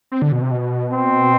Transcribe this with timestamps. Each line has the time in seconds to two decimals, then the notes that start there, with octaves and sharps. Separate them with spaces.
0.12 C4
0.22 D3
0.32 B2
0.42 C3
0.51 B2
0.92 C4